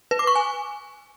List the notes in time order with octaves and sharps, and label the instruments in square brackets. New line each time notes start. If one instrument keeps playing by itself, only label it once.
[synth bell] B4
D6
C#6
G#5